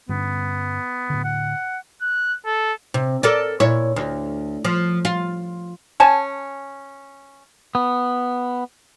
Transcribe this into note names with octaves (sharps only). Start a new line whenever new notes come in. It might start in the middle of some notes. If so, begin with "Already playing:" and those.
G2 D3 B3 C#4
A2 D3
F#5
F#6
A4
C3
A4 A#4 D5
A#2 E4 C#5
D2
F3
F4
C#4 G#5 A5
B3